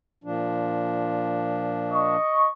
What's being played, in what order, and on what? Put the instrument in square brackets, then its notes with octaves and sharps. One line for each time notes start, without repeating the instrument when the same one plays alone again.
[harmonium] A#2 F3 D4
[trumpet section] D#5 C#6